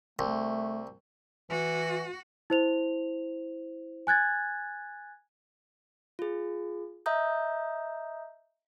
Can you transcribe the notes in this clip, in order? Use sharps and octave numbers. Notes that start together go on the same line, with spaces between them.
C2 A3
E3 F#4
E4 C5 F7
G#5 F#6 G#6 A6
F4 G#4
D#5 E5 A#5 D#6 G6